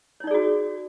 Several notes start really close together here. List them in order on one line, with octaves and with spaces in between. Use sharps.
C#5 D#4 D5 G#4 F#4